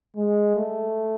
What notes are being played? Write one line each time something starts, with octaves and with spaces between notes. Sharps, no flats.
G#3
A3